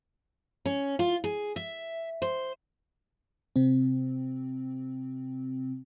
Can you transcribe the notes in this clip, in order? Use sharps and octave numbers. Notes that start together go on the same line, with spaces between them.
C#4
F4
G#4
E5
C5
C3 C4